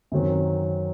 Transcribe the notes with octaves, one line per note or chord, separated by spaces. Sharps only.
F#2 D#3 F#3 C4